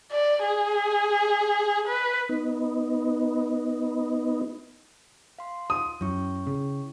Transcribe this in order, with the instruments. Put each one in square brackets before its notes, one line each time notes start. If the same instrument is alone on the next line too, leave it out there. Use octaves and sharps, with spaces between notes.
[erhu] D5
G#4
B4
[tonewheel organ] B3 D#4
[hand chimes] F5 C6
[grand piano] D#6
[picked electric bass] F#2 [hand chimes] C#4 E4 C#6
[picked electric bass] C#3